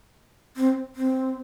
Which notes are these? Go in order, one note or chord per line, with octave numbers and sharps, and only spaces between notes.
C4
C4